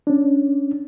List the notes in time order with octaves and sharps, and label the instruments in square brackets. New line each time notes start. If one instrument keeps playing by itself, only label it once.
[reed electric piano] C#4 D4